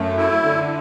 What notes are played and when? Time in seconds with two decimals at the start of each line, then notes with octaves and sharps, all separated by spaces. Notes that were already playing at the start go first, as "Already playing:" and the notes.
Already playing: F#2 A3
0.17 E4
0.43 D3